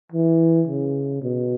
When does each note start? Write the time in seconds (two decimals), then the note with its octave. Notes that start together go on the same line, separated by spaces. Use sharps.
0.12 E3
0.67 C#3
1.22 B2